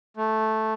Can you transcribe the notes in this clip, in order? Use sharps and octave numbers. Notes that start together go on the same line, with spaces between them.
A3